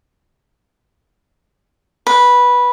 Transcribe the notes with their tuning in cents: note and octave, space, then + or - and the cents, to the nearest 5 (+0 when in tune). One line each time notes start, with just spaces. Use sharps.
B4 -10